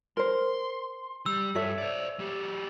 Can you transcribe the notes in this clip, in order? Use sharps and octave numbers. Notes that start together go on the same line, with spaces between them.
A#4 C5 C6
G3 E6
G2 A4 C#5 E5
C5 D5
F#3 G4